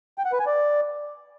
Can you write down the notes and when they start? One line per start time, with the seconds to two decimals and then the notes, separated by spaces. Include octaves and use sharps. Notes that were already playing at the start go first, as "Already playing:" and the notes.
0.18 G5
0.25 F#5
0.32 B4
0.39 G#5
0.46 D5